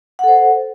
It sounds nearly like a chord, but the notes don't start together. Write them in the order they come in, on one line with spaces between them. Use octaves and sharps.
F#5 A4 C5